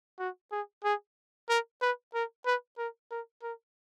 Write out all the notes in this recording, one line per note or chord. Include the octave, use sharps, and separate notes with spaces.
F#4
G#4
G#4
A#4
B4
A#4
B4
A#4
A#4
A#4